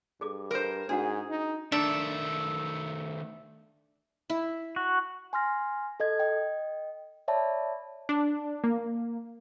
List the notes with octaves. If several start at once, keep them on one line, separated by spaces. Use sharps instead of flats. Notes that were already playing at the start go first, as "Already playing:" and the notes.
G2 G#4 A4 D6
A#4 C5
G#2 D4 F#4 G#4 F#5
D#4
D#3 A3 D4 E5
E4
F#4
G#5 C6 F6 A#6
A4 D#5 G#6
D#5 G5
C#5 D5 E5 A5 B5
D4
A#3